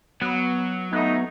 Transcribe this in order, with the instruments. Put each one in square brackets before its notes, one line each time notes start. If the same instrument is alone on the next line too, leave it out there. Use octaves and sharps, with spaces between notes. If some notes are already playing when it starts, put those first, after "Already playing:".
[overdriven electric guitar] F#3 [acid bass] B3
[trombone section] A3 D#4 [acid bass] B3